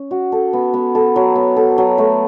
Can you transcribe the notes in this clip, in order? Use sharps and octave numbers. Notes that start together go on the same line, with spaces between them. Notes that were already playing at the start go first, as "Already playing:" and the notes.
Already playing: C#4
F#4
A4
B3
B3
A4
F#3
B3
A4
F#3
A3